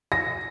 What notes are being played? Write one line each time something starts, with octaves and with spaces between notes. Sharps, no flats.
A#6